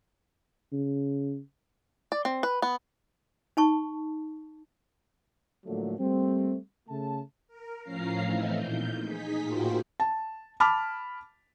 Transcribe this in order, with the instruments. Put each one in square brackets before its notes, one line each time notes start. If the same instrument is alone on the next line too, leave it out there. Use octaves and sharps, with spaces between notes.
[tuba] C#3
[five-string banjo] D5
C4
B4
B3
[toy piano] D#4 A5 C#6
[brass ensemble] A2 D3 F3 F#3 A3 A#3
G3 A3 A#3 C4
C#3 A3 A5
[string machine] A#4
A2 F3 C#4 F5 A#5 C7
E3 F3 A3 C4 D#4 E4
A#2 G6
D#4 G#4 B6
A2 A#3 F4 F#4 C5 G5
[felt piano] A5
A5 B5 D6 F6